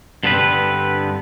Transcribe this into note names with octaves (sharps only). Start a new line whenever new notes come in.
G2 D3 B3 C4 B4